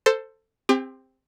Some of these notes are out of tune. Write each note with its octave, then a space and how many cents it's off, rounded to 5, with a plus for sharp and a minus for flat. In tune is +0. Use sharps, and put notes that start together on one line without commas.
A4 +15 C5 +0
C4 +0 G4 +40